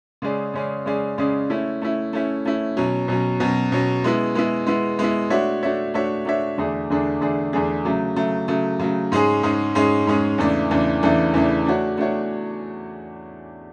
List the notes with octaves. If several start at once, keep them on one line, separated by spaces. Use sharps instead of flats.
C#3 G#3 C#4 G#4 D5
C#3 G#3 C#4 G#4 D5
C#3 G#3 C#4 G#4 D5
C#3 G#3 C#4 G#4 D5
A3 C#4 E4
A3 C#4 E4
A3 C#4 E4
A3 C#4 E4
B2 F#3 C#4
B2 F#3 C#4
B2 F#3 C#4
B2 F#3 C#4
G#3 B3 E4
G#3 B3 E4
G#3 B3 E4
G#3 B3 E4
A3 D4 F#4 C#5 E5
A3 D4 F#4 C#5 E5
A3 D4 F#4 C#5 E5
A3 D4 F#4 C#5 E5
E2 D3 A3 D4 G#4
E2 D3 A3 D4 G#4
E2 D3 A3 D4 G#4
E2 D3 A3 D4 G#4
C#3 F#3 A3
C#3 F#3 A3
C#3 F#3 A3
C#3 F#3 A3
G#2 G#3 C#4 G#4
G#2 G#3 C#4 G#4
G#2 G#3 C#4 G#4
G#2 G#3 C#4 G#4
E2 C#3 E3 A3 D4
E2 C#3 E3 A3 D4
E2 C#3 E3 A3 D4
E2 C#3 E3 A3 D4
A3 D4 F#4 C#5
A3 D4 F#4 C#5